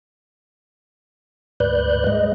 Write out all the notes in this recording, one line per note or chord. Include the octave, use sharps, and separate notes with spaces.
D2 G#2 B4 D5 F#6 G6
G#3 D#5